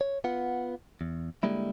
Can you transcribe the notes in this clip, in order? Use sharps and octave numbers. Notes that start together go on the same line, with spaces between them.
C#5
B3 F4 F#5
E2
D3 G3 G#3 A#3 E4